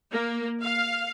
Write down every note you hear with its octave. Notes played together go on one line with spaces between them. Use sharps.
A#3
F5